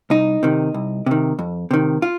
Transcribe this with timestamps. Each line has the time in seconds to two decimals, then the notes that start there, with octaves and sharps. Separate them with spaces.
0.10 C2 D#4
0.43 C3 D#3
0.74 C2
1.06 C3 D#3
1.39 F2
1.71 C3 D#3
2.02 F4